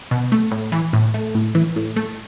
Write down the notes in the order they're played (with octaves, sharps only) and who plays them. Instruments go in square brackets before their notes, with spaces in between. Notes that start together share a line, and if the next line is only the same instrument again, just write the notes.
[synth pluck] B2
A3
A2
E3
A2
A3
A2
E3
A2
A3